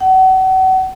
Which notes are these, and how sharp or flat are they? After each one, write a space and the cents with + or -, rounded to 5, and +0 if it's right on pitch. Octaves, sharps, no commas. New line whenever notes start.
F#5 +35